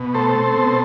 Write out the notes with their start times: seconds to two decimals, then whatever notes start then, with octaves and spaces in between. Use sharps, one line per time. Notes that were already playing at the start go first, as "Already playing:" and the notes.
Already playing: B2
0.14 A3 A4 C5
0.35 C4
0.57 B2